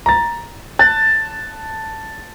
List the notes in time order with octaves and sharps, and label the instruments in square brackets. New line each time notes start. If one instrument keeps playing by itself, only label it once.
[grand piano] A#5 A6
[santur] A5 [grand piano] F#6